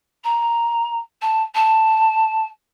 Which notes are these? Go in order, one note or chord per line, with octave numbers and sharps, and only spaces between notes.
A#5
A5
A5